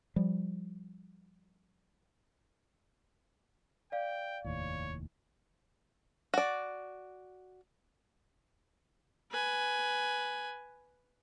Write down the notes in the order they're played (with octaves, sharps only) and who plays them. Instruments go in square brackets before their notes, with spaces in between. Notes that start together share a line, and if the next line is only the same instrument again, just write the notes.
[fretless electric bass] F3 G3
[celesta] D5 F5 [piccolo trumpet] G5
[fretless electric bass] F1 D#2 A2 [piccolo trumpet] C#5
[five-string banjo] F#4 D5
[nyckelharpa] B4 G#5